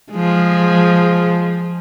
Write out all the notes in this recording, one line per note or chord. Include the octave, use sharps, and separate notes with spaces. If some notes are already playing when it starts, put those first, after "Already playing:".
F3 G#3